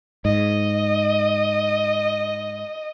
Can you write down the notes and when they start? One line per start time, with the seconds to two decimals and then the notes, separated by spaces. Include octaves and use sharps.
0.25 G#2 D#5